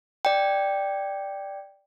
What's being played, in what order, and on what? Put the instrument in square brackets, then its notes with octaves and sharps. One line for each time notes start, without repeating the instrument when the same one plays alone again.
[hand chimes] D5 G5